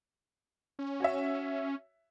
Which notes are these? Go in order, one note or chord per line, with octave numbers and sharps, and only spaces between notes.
C#4
F#4 C#5 E5